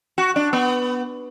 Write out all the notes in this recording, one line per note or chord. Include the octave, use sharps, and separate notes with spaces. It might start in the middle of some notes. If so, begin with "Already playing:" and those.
F#4
D4
B3